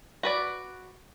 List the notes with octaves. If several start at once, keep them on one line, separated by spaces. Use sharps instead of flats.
F#4 B4 D5